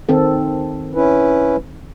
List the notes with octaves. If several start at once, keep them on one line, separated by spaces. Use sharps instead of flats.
D#3 C4 A4
C#4 E4 B4